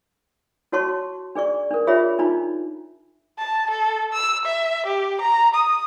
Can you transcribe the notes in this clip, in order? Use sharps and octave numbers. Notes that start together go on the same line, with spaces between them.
E4 F#4 C#5 A5 C6 C#6
D4 G#4 D5 C#6
D4 A#4
F4 G4 G#4 C#5 E5 B5
D4 D#4 F4 A#5
A5
A4
E6
E5
G4
A#5
D#6